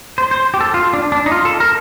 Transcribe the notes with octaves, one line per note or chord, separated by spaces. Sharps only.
C5
C5
G4
A4
F4
D4
D4
D#4
F4
A4
A#4